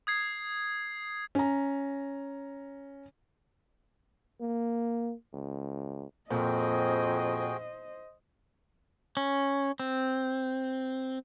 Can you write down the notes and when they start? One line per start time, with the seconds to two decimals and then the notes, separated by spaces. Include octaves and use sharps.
0.07 D#6 G#6 C7
1.35 C#4 A#5
4.41 A#3
5.33 C#2
6.31 F2 A#2 F#4 G#4 C5 D#5 G5
9.17 C#4
9.80 C4